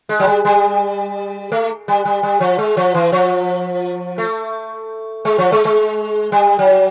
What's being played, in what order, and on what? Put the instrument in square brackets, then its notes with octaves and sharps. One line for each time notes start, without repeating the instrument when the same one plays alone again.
[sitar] G#3
F#3
G3
G3
A3
G3
G3
G3
F3
G#3
F3
E3
F3
A3
G#3
F3
G#3
G#3
G3
F#3